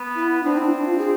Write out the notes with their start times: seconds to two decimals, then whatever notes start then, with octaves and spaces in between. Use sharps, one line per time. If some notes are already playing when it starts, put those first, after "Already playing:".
Already playing: B3
0.16 E4
0.44 C4 D4
0.58 E4
0.65 D4
0.86 F4
0.98 G#4